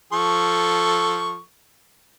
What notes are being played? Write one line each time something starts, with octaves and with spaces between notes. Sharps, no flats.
F3 A4 C#6